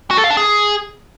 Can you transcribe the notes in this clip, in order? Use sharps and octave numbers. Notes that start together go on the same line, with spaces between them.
F#4
A4
F5
D4
G#4